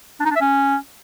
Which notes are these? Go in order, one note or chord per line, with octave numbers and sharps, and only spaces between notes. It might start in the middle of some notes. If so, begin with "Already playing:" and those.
D4
D#4
D4
E5
C#4